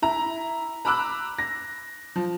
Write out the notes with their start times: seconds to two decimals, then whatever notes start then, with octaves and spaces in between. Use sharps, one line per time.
0.02 E4 A#5
0.85 A#5 B5 D6 E6 F#6
1.39 A#6
2.16 F3